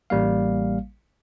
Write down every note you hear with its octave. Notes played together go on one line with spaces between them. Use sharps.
A1 G3 A#3 F5